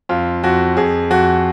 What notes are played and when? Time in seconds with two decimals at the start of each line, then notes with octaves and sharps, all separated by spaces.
0.09 F2 F4
0.44 F2 F#4
0.77 F2 G#4
1.10 F2 F#4